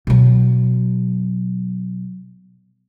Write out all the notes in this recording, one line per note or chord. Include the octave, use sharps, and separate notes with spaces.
B2 F#3